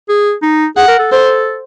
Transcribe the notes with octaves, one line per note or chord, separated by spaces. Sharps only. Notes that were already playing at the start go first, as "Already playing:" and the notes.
G#4
D#4
G#4 F#5
A#4
A4
A4 C5